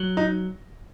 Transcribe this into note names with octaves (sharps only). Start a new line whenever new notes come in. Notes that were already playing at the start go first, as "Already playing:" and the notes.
Already playing: F#3
D#4